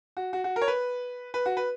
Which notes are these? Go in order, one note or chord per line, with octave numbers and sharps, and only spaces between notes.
F#4
F#4
F#4
A#4
C#5
B4
B4
F#4
B4